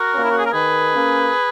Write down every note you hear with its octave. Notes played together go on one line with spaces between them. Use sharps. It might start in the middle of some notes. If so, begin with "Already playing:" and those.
Already playing: F#4 A#4
A#3 C#4
E4
F#4
G#4
A#4
D#3 G#4 B4
A#3 C#4